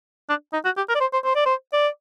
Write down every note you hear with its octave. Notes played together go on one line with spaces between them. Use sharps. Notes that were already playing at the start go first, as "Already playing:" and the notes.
D4
D#4
F#4
G4
A#4
D5
C5
C5
C5
D5
C5
D5